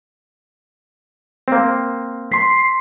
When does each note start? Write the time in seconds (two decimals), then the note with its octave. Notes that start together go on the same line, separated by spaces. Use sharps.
1.48 A#3 C4
2.32 C6 B6 C7